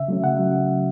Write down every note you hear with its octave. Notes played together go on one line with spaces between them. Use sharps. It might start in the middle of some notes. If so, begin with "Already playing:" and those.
Already playing: C#3 E5
F#3 A3 C#4
C#3 F#5
F#3